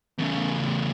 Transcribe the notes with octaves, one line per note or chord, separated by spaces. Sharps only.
E2 C#3